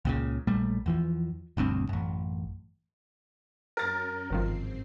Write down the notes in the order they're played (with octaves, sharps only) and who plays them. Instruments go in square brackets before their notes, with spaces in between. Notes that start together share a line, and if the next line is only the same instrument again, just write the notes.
[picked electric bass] C#2 A#2 C#3
A#1 A#2 G3 A3
E2 E3 F3
E1 D2 G2 C4
A1 F#2
[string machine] F#2 C#4 [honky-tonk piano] A#4 A6
[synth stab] G1 D#3 F3 [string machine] G#2 C4 C7